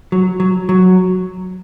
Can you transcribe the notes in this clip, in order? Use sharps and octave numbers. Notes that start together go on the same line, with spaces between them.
F#3
F#3
F#3